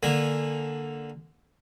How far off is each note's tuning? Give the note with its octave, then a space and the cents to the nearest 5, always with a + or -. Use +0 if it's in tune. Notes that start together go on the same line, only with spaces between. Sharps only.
D3 +5 A#3 +0 G#5 -15